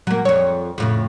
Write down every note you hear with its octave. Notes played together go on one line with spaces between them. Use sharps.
F#3 A#3
F2 C#5
F2 A2 C#3